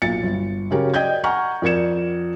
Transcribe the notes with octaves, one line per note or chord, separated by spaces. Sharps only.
B1 A#2 A6 C#7
G1
C#3 F#3 C#4 G4 A#4
D5 D#5 G5 G6 G#6
F#5 G#5 A#5 C#6 F6
F2 A#4 D5 G#6 C#7 E7